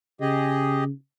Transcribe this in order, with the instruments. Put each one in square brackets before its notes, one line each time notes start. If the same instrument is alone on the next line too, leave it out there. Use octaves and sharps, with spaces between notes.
[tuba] C#3 [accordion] G4 G#4 D#5